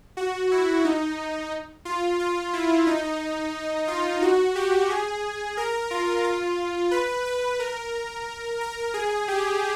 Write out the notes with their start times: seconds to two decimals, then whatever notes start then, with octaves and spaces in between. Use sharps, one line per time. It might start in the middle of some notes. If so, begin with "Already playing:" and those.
0.17 F#4
0.51 E4
0.85 D#4
1.85 F4
2.20 F4
2.53 E4
2.87 D#4
3.88 F4
4.22 F#4
4.55 G4
4.90 G#4
5.57 A#4
5.91 F4
6.25 F4
6.91 B4
7.26 B4
7.59 A#4
8.61 A#4
8.94 G#4
9.28 G4